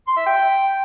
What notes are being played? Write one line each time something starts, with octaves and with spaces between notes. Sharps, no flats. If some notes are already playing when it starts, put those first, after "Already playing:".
C6
E5
G5